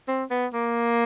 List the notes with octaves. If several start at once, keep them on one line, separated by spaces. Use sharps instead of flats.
C4
B3
A#3